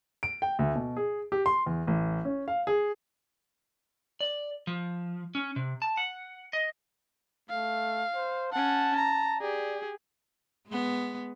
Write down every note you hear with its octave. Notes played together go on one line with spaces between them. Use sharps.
D7
G5
D2
B2
G#4
G4
C6
E2
A1
C#4
F5
G#4
D5
F3
C#4
C3
A5
F#5
D#5
A3 F5
C5
C#4 F#5 A5
A#5
G4 G#4 D5
G#3 B3